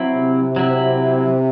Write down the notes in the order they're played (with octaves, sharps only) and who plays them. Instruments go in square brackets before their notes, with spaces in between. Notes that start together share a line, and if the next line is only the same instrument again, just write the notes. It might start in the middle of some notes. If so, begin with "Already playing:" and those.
Already playing: [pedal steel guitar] F#3 C4 E4
[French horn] C3
[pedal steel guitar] F#3 C4 E4